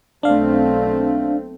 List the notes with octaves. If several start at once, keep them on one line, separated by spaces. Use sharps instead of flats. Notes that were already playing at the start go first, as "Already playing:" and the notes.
B1 A3 C4 D4 F5